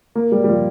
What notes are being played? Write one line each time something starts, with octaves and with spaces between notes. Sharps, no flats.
A#3
G3
G3
F3